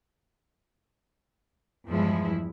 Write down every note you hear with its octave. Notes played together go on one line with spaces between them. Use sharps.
E2 G2 F3 G#3 E4